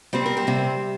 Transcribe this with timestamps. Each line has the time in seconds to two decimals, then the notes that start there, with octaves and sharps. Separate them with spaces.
0.13 C3 G3 C4 C5
0.26 A#4
0.37 G4 C5
0.47 C3 G3 C4